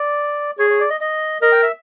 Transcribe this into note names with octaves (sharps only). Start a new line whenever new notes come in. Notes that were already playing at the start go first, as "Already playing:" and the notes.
Already playing: D5
G#4 C#5
C#5
D5
D#5
D#5
A#4 D#5
G5
E5